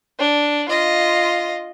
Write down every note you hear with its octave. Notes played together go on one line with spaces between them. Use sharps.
D4
F4 D#5